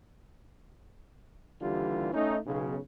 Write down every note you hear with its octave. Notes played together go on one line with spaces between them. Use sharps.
D#2 D3 E3 G3 F4
A3 C#4 D#4
B1 C#3